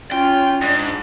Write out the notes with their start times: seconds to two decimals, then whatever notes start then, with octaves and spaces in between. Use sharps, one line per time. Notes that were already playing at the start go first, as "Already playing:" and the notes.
0.12 C#4 F4 G5
0.62 G#2 D4